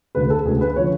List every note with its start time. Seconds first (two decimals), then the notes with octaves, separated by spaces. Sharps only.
0.15 D2 D3 G#3 B4
0.30 A4
0.45 D2 D3 G#3 G#4
0.61 B4
0.76 D3 F3 C#5